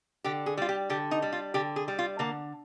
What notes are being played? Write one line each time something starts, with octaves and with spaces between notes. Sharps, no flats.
D3 G4
G#4
G3 F4
G4
D3 G4
D#4
G3
F4
D3 G4
G#4
G3
F4
D3 A#3